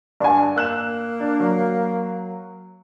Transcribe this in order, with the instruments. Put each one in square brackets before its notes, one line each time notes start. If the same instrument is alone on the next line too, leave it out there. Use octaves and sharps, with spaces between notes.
[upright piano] G2 G#5 [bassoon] D4
[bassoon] A#3 [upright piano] E6 F#6 E7
[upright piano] D4
F#3